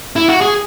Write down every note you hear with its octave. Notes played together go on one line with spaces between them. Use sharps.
E4
F#4
G#4